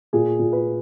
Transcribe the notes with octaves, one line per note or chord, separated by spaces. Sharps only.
A#2 G#4
A#2
B4